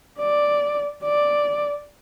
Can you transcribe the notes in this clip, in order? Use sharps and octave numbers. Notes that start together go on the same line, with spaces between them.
D5
D5